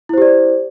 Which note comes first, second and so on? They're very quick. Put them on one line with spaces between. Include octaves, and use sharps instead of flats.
E4 C5 G4 D5